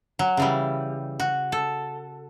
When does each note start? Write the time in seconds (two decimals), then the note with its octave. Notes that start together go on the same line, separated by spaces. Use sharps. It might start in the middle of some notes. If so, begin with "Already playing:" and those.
0.19 F#3
0.37 C#3 E3 G3
1.20 F#4
1.52 A4